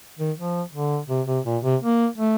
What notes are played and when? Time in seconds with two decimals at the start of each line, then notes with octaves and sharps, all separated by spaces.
0.19 D#3
0.37 F3
0.73 D3
1.09 C3
1.27 C3
1.45 A#2
1.64 C3
1.82 A#3
2.18 A3